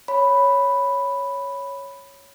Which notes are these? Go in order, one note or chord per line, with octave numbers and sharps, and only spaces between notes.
C#5 B5